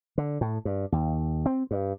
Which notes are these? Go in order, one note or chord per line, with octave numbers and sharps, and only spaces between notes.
D3
A2
G2
D#2
C4
G2